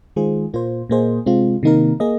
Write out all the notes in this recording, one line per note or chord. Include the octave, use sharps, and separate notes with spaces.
D#3 G#3 F4 G#4 C5
A#2 A#3 F4 C5
A#2 A#3 G#4 C5 D#5
C3 G#3 C4 F4
C3 D#3 A#3 D#4 A#4
A#3 G#4 D#5